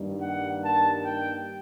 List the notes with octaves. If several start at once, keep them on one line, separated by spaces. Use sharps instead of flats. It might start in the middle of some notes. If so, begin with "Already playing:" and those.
Already playing: G2 D#3 G3 A#3
F#5
A5
G5